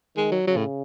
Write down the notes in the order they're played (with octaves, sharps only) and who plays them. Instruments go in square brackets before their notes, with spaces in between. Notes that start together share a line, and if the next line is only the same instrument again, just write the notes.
[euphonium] D#3 [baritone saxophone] G#3
[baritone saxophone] F#3
[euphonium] C#3 [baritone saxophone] F#3
[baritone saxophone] A2